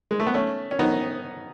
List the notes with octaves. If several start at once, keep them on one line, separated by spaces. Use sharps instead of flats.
G#3
A3
B3
A3 C#4
C#4
B3 D#4